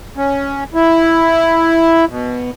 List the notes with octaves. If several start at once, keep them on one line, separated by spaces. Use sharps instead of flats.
C#4
E4
B2